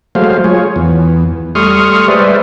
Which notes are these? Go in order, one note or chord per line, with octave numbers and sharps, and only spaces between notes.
F#3 G#3 A3 C5 F5
F4 G#4 C#5
E2
G3 A3 C6 C#6 D#6 F6
G#3 B4 C5 D5 E5